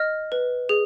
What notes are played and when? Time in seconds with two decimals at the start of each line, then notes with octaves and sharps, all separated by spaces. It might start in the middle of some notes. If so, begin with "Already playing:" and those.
Already playing: D#5 F6
0.32 B4
0.69 G#4